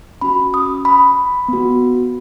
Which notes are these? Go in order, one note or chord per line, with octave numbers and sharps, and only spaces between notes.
C#4 F#4 B5
D#6
B5
B3 F#4